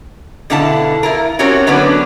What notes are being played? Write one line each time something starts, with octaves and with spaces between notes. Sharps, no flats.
B2 D3 B3 E4 F5 A5
E4 F4 A#4
C4 C#4 F#4 G4 A#4 C#5
D3 F#3 B3 C#4 D4 B4